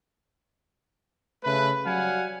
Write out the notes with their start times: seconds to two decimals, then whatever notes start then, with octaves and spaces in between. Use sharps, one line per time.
1.44 C#3 A3 B4
1.85 F#3 G3 F5 F#5 G#5